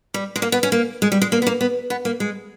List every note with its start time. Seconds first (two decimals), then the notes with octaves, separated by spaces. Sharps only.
0.14 G3
0.36 G#3
0.42 A#3
0.52 B3
0.63 C#4
0.72 A#3
1.02 G#3
1.12 G3
1.22 G#3
1.32 A#3
1.42 B3
1.47 A#3
1.61 B3
1.90 B3
2.05 A#3
2.20 G#3